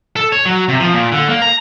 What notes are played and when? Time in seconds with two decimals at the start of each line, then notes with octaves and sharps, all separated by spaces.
0.16 A4
0.32 C#5
0.46 F#3
0.68 C3
0.80 F3
0.93 A#2
1.12 D3
1.29 A#3
1.42 A#5